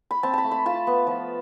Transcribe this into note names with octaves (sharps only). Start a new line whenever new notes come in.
B5
C4 A5
A5 B5
A3
B5
F4 A5
B3
F3